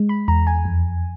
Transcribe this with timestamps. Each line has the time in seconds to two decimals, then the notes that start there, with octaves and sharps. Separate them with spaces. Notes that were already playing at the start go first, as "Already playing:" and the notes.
Already playing: G#3
0.09 B5
0.28 E2 A#5
0.47 G#5
0.65 F2